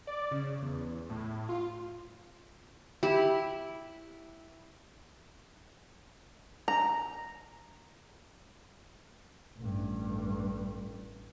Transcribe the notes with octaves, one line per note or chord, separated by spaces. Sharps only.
D5
C#3
E2
A2
F4
E4 G4
A#5
A1 G2